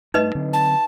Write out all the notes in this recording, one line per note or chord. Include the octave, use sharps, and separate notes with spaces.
G2 A3 D#4 B4 D#5
D3 F#3 C4
A5